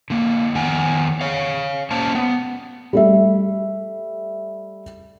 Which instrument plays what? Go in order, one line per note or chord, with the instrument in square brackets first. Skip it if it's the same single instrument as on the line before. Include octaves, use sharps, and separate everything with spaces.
[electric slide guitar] D3 A#3
F2 D#3 B3 F#5 G#5
C#5 F5
A#3 C#4 C5 A5
B3
[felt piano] G3 A3 E5